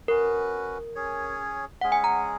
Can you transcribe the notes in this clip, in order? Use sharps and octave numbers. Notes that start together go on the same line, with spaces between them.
C#4 F#4 A#4 B4
C#4 G#4 C#5
G#3 C#4 G#4 F#5
G#5
A#5